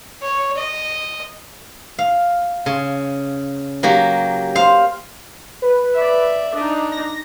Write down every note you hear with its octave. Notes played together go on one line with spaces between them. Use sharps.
C#5
D#5
F5
C#3
F#3 A#3 G4
C5 F5
B4
D5 E5
D4 D#4 D#5
A#6